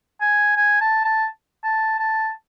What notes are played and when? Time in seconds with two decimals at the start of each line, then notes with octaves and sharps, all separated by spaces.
0.21 G#5
0.57 G#5
0.81 A5
1.05 A5
1.64 A5
1.99 A5